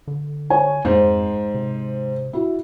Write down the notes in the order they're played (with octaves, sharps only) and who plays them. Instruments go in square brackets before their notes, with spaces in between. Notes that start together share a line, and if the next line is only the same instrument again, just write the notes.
[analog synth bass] D3
[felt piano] C#5 G#5
[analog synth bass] F2 [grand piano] G#2 [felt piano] C5
[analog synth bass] C3
[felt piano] E4 F#4